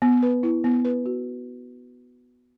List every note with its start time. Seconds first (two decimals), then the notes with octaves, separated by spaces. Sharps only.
0.02 B3
0.23 B4
0.43 E4
0.64 B3
0.85 B4
1.06 F#4